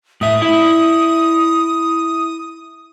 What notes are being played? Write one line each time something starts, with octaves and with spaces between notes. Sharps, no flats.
A2 E5 D#6
E4 E5